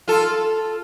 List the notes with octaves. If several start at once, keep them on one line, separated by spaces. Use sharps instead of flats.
F4 A4